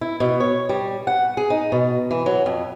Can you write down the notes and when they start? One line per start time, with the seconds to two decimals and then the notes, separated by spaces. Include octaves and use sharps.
0.01 E4
0.20 B2
0.40 C#5
0.69 G3
1.07 F#5
1.37 G#4
1.50 D#4
1.72 B2
2.11 E3
2.26 F#3
2.46 F2